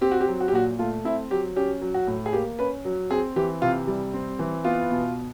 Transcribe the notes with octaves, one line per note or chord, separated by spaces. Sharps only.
C4 G4
F#4
G4
F#3
F#4
G4
A#2 F#4
A3 F4
C4 E4
F#3 G4
C#4 G4
F#3
F#4
A2
G#4
A#3 G4
C#4 B4
F#3
C4 G#4
E3 G4
C3 F4
G3
C4
E3
B3 F4
B2